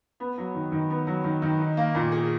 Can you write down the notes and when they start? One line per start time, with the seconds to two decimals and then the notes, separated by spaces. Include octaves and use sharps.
0.20 B3
0.38 F#3
0.55 D#3
0.72 D#3
0.90 B3
1.07 F#3
1.24 D#3
1.42 D#3
1.59 D#4
1.77 A#3
1.95 A#2
2.12 G#4